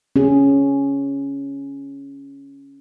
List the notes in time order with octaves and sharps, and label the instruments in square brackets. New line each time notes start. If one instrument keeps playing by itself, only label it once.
[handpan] C#4 G#4